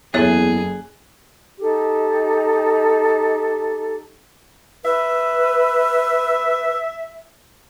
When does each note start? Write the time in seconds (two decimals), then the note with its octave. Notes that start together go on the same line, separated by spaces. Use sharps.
0.14 F#1 E2 G#4 A4 C#5 E5 F#6
1.60 D#4 G4 A4
4.85 B4 E5 E6